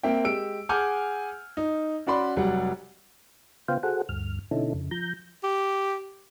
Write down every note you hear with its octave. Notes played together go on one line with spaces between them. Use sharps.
A#3 C4 E5 G5
G#3 G4 E6 D7
G#4 F#5 G#5 D6 F6 G6
D#4
C#4 F#4 D5 B5 C6
F1 F#3 G3 F#5
C#3 B3 F4 C5 F5 G5
F#4 G#4 A4 C5 F#5
D2 G2 F6
B2 D3 C#4 D#4 E4 A4
F2 C#3
F3 A#5 G6
G4